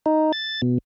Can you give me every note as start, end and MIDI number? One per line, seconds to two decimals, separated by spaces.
0.06 0.32 63
0.33 0.61 93
0.62 0.78 47